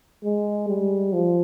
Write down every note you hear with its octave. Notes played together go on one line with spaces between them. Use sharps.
G#3
G3
F3